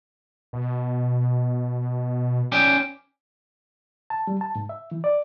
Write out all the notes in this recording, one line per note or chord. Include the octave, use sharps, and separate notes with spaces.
B2
C#4 D5 G5
A5
G3
A5
G#2
E5
E3
D5